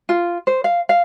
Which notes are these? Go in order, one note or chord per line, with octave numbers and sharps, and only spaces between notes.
F4
C5
F5
F5